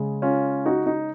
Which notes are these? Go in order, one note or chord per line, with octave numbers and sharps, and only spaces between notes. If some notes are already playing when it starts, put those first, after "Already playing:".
Already playing: C#3 G#3
C#4 F4
D#4 F#4
D#4